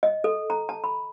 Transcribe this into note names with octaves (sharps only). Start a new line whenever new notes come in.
D#5
A4
A#5
A5
B5